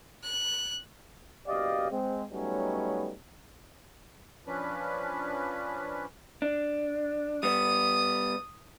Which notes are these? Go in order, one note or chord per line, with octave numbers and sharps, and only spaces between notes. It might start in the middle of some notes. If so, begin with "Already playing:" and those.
F#6
F#1 B2 G4 D5 D#5 F5
G#3 C4
F#3 G3 A3 B3 C#4 D#4
F3 C#4 D4 B4
D4
G3 B3 D#6